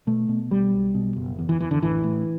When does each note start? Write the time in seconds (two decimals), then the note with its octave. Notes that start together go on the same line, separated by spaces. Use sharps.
0.07 B2 A3
0.29 B2
0.50 B1 G3
0.73 B1
0.95 B2
1.16 F#1
1.39 E2
1.49 E3
1.60 F#1 E3
1.71 D3
1.82 A1 E3
2.04 A2